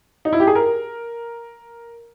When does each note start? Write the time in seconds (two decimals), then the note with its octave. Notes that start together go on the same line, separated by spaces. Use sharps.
0.25 D#4
0.33 E4
0.40 G4
0.47 G#4
0.55 A#4